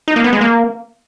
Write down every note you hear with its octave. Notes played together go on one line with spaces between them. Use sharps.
D#4
A#3
B3
G#3
A#3